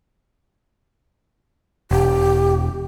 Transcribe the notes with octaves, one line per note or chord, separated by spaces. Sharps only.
E1 G4